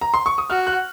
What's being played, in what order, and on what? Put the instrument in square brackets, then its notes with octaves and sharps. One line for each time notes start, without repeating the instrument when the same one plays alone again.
[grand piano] A#5
C6
C#6
D#6
[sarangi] F#4 [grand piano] F6
[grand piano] F#6